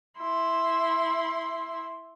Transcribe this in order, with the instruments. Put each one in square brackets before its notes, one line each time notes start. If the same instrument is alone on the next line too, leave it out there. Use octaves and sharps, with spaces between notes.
[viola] E4 C6